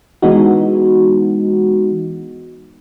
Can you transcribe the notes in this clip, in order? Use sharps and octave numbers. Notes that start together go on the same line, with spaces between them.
E3 G#3 B3 D#4 F#4